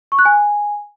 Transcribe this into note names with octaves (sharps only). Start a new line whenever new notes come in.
C#6
F#6
G#5